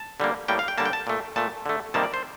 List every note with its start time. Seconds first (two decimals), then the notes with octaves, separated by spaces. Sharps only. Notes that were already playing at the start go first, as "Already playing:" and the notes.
Already playing: A5
0.20 D3 G3 A#3
0.48 A2 G3 A#3 G5
0.59 F5
0.68 G5
0.78 D3 G3 A#3 A5
0.85 G5
0.93 A5
1.07 A#2 A3
1.36 A#2 A3 A5
1.66 D3 A3
1.94 C3 D#3 G3 A#3 A5
2.03 D5
2.14 C5